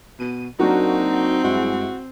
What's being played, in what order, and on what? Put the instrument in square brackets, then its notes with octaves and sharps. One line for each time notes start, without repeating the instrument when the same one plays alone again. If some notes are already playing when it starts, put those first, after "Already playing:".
[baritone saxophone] B2 [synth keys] D#7
[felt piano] F#3 D4 [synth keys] A#3 F#4 A#4 [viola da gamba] C4 [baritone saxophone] D#4
[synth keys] G2 G#3 E4 [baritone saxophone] F#4